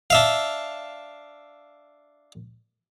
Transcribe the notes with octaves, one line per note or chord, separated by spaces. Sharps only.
D4 E5 F5